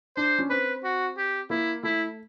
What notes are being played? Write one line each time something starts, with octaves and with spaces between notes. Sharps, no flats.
D4 C5
C#4
C4 B4
F#4
G4
A#3 E4
A3 E4